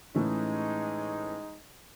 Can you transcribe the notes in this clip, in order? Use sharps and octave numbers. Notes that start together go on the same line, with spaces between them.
A2 E3 G#3 C#4 D#4